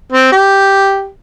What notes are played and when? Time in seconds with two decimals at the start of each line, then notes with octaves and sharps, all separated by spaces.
0.12 C4
0.32 G4